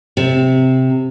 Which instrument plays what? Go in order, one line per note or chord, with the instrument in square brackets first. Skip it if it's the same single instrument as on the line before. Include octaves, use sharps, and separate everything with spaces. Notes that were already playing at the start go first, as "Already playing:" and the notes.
[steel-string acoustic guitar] C3